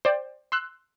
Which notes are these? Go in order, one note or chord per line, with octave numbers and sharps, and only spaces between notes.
C5 D5 G5
C6 E6 F#6